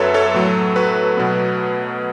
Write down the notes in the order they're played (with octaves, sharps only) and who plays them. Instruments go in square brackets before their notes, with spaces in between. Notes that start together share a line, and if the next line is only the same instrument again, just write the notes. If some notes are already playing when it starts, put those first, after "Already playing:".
Already playing: [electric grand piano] F#2 F#3 B3 A4 B4 C#5 E5
A4 C#5
A2 F#3 A3 A4
F#4 B4
B2 F#3 B3